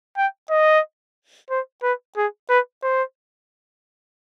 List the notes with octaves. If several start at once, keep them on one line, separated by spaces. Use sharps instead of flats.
G5
D#5
C5
B4
G#4
B4
C5